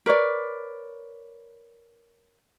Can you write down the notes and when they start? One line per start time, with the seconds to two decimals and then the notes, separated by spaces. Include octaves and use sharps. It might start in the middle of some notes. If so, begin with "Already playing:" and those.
0.06 A#4 B4 C#5 D5